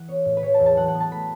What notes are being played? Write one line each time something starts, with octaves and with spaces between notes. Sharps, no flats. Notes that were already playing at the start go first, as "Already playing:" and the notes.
Already playing: E3 F#5
B3 C#5
A2
B4
E3 C#5
A5
E2
A5
F#3 F#5
F#5
B3
A5
A3 B5